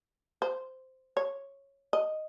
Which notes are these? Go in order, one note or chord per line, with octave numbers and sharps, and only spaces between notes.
C5
C#5
D#5